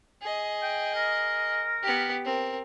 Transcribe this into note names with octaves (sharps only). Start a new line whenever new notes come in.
G#4 D#5
G5
A#4
B3 G4
C4 A#4